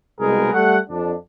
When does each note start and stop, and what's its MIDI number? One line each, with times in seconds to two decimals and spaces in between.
0.20 0.52 36
0.20 0.52 47
0.20 0.52 56
0.20 0.52 68
0.20 0.52 70
0.20 0.52 71
0.53 0.77 55
0.53 0.77 57
0.53 0.77 78
0.90 1.14 41
0.90 1.14 62